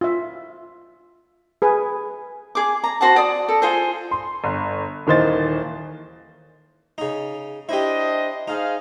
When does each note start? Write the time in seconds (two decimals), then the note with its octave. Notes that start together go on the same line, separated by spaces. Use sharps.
0.01 F4 E5
1.62 G#4 B4 G#5
2.55 G#4 D6
2.84 A#5
3.01 F#4 C5 F#5 A5
3.16 D5 D#6
3.48 A4
3.62 F4 G#4 A4 C5
4.11 C6
4.44 G1
5.07 D#1 D#3 E3 C5 D#5 A6
6.98 C#3 D#4
7.69 D4 E4 G4 C5 D#5
8.48 D#4 G#4 C5 F5